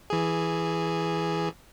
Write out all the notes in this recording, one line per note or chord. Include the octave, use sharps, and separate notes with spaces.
E3 G#4